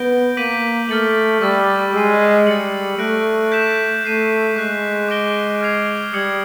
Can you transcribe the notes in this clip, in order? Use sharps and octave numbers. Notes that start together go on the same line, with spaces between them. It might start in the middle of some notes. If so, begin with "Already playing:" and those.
Already playing: B3 G6 A#6 D7 G7
A#3 D6 G6 B6 D#7 F#7
A3 F6 A6 C#7 F#7
G3 C#6 E6 A6
G#3 E6 A6 C7 D#7
G3 A6 C#7 F#7
A3 F#6 A#6 D7
G6 B6 E7
A3 G6 C7 D#7
G#3 C#6 F#6 B6
D6 F#6 A#6 D7 G7
F6 G#6 C7 F7
G3 D#6 G#6 C#7 F#7